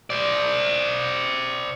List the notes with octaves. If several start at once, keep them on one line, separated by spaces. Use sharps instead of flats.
C5 D5